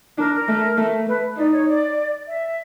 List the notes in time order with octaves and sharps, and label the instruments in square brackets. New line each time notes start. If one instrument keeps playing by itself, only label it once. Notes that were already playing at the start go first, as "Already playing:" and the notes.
[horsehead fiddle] D4 [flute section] A#4
[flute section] A#4
[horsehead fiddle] A3
A3
[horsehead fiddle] A3 [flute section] B4
[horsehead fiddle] D#4 [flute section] D5
[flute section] C#5
D5
E5